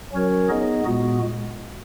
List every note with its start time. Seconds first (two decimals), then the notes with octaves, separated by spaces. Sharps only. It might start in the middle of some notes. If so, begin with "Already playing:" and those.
0.12 F#3 C#4 F#4 A#4 C#5
0.49 B3 D#4 G#4 D#5
0.85 A#2 G#3 B3 F#4